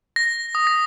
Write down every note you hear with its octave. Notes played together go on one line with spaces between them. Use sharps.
A#6
D#6
A#6